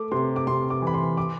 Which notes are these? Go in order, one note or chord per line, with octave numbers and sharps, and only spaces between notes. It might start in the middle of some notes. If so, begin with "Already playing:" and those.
Already playing: A3 D6
C3 C6
D6
C3 C6
D6
E3
B5
C6
D6